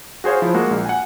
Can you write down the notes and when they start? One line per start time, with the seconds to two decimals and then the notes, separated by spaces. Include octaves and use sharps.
0.24 F#4 G#4 C5 C#5 F5
0.42 F3 E4
0.54 G#3 A#3 F#4
0.71 A#1
0.86 F#5 G#5